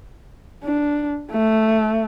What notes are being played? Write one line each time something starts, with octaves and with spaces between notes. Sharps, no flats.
D4
A3